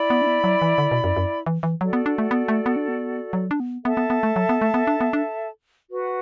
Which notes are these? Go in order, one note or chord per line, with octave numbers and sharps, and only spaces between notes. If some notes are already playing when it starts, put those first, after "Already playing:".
Already playing: E4 D5 B5
B3
D4
B3
F#3
E3
D3
B2
F#2
F#2
E3
E3
F#3 F#4 A4 D5
B3
D4
A3
B3
A3
B3
D4
B3
F#3
D4
B3
B3 A4 E5 A5
B3
B3
A3
F#3
B3
A3
B3
D4
B3
D4
F#4 B4 F#5